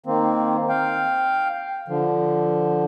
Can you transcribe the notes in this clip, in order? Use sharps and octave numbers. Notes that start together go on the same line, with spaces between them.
D#3 A#3 C4
F5 G5
D3 F3